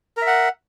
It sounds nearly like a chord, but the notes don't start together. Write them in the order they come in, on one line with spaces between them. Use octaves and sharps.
A#4 E5 F#5